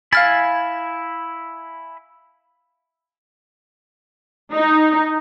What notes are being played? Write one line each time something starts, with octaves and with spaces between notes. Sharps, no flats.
E4 F5 G#5 B5 F6 A6
D#4